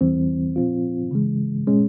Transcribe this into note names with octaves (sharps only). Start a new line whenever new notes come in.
E2 E3 G3 C4
A#2 F3 C4 F4
C#3 E3 G#3
A#2 G#3 C#4